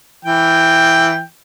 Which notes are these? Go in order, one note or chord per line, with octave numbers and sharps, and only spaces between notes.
E3 G5